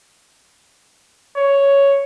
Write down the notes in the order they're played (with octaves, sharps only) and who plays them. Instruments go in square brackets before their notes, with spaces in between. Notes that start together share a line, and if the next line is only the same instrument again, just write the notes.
[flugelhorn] C#5